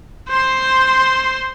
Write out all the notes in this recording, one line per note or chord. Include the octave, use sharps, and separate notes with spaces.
C5 C6